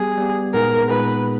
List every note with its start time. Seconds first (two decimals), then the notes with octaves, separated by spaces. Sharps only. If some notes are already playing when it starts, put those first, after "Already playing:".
Already playing: G3 B3 G4 G#4
0.17 G3 B3 G4
0.54 A#2 G#3 B3 D#4 G#4 A#4
0.89 A#2 G#3 B3 D#4 G#4 B4